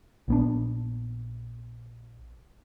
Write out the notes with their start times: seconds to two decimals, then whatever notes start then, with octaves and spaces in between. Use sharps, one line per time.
0.28 A#1 B3 D4